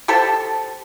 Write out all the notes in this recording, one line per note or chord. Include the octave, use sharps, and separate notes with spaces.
G4 A4 C5 A5